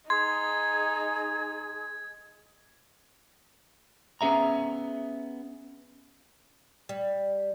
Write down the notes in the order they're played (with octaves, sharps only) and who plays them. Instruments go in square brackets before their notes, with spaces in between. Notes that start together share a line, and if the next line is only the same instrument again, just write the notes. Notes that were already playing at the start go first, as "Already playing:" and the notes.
[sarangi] D#4 [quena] G#4 [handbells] C6 [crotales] G#6
[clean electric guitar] B3 C#4 G#4 E5 A#5
[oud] G3